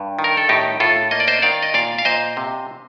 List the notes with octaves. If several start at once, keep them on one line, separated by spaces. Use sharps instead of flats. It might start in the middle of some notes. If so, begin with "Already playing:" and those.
Already playing: G2
D#3
A#4
A4
A2 D#4 G4
A2 F4 A4
A#3 D#5
D5
C5 D#5
D#3 D5 F5
D#5
A#2 D5 F5
F5
A#2 C5 D#5
C3